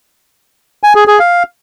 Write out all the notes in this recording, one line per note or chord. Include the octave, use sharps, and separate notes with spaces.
G#5
G#4
G#4
F5